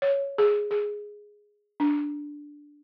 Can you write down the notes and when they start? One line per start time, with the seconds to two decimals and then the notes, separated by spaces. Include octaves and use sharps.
0.02 C#5
0.38 G#4
0.71 G#4
1.80 D4